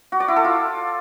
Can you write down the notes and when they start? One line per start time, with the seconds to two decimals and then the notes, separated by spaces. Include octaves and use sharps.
0.12 F#4
0.20 D5
0.28 E4
0.36 A4
0.44 F4